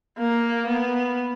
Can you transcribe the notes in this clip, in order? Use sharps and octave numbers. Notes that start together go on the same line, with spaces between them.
A#3
B3